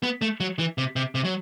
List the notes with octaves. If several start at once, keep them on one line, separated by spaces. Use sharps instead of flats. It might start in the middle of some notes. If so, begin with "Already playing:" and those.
B3
A3
F#3
E3
C3
C3
C3
F#3